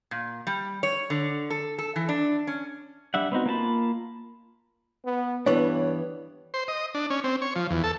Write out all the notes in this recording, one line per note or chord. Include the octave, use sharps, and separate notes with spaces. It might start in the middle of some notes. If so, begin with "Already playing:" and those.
A#2
G3
C#5
D3
A4
A4
E3
D4
C#4
G3 D4 E5 F#5
B3 C4 D#4 F#4
A#3 F4 A5 B5
B3
G2 E3 B3 D4 C#5
C5
D#5
D4
C#4
C4
C#5
F3
E2
A4